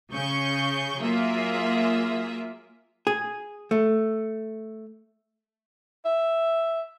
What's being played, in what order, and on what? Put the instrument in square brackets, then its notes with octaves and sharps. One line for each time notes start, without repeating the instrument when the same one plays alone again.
[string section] C#3 C#6 G6
F#3 A#3 F4 G#4 E5
[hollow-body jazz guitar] G#4
A3
[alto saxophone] E5